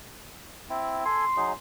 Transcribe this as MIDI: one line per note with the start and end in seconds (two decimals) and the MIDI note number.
0.70 1.04 60
0.70 1.04 64
1.05 1.25 69
1.05 1.25 80
1.05 1.55 84
1.37 1.53 54
1.37 1.53 63
1.37 1.53 68